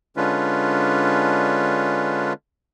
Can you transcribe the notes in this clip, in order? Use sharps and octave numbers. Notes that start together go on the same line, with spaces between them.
D3 G#3 C#4 D4 F4 B4